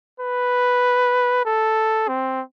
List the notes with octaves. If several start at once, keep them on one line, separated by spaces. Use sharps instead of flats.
B4
A4
C4